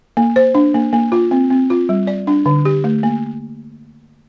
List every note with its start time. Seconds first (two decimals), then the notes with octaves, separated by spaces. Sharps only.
0.17 A#3
0.36 C5
0.55 D4
0.74 A#3
0.93 A#3
1.12 F4
1.31 C4
1.50 C4
1.70 F4
1.89 G3
2.07 D5
2.27 D4
2.46 D3
2.65 G4
2.84 A3
3.03 A#3